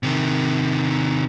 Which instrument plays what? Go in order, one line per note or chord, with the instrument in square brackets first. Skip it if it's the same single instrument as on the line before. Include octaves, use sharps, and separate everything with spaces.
[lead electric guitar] C3 D#3